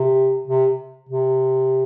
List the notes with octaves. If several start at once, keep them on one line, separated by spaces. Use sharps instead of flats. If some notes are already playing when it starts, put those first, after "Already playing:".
Already playing: C3
C3
C3